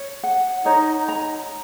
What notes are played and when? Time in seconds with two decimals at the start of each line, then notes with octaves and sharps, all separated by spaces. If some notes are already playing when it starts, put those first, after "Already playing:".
Already playing: C#5
0.23 F#5
0.66 D#4 C#5
1.08 A#5